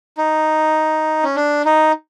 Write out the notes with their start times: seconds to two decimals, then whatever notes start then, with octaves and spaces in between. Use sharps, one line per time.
0.18 D#4
1.23 C#4
1.36 D4
1.65 D#4